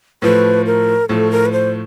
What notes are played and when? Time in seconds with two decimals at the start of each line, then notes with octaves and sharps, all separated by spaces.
0.22 A2 F3 A3 B4
0.66 A#4
1.09 A2 F3 A3 A4
1.31 A#4
1.45 B4
1.52 C5